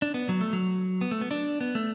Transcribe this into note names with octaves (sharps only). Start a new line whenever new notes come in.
D4
B3
F#3
A3
F#3
B3
A3
B3
D4
B3
A3